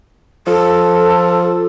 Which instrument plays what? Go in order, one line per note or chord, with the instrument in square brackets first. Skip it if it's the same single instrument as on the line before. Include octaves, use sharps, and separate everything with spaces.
[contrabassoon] F3 [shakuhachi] A4